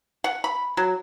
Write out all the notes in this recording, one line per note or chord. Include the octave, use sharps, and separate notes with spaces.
F#5
B5
F#3